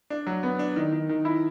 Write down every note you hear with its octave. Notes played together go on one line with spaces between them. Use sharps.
D4
F#3
B3
D4
D#3
D#3
D#3
E4